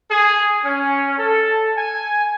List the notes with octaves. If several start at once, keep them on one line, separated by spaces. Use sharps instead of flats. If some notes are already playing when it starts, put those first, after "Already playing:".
G#4
C#4
A4
G#5